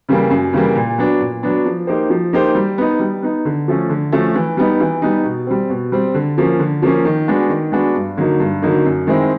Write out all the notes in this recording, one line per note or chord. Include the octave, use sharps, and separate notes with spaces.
C#3 E3 G3 A#3
F#2
C#3 E3 G3 A#3
A#2
F#3 B3 D4
A#2
F#3 B3 D4
F3
A#3 D#4 G4 C5
F3
A#3 D#4 G4 C5
G3
B3 D#4
G3
B3 D#4
D3
F3 A3 C#4
D3
F3 A3 C#4
E3
G3 B3 D#4
E3
G3 B3 D#4
B2
G3 C4
B2
G3 C4
D3
F3 A#3 C#4
D3
F3 A#3 C#4
D#3
G#3 B3 D4 F#4
D#3
G#3 B3 D4 F#4
G2
D3 F#3 A#3 D#4
G2
D3 F#3 A#3 D#4
F#2
D#3 G#3 C4 E4